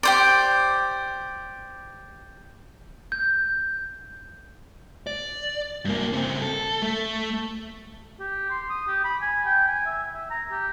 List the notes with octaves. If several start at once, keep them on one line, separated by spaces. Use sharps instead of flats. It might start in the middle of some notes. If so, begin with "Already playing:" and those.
G4 C5 D5
G6
D5
G2 A#3
C#3 C4
A4
A3
G4
C6
D#6
G4
B5
G#5
G5
G#5
E5
E5
A#5
G4